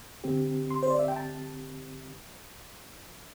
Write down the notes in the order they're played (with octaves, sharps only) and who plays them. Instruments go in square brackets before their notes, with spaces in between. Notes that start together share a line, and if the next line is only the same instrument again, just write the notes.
[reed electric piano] D3 C4 G4
[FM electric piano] C6
C5
D5
E5
G5
A5